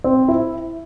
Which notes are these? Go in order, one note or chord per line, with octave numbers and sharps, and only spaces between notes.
C4
E4